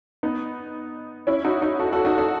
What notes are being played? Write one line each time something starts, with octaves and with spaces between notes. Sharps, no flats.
B3 D#4
C#4 E4
D#4 F#4
D#4 F#4
F#4 A4
F#4 A4
D#4 F#4
F#4 A4